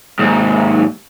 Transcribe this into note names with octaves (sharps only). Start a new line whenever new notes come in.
D#2 G#2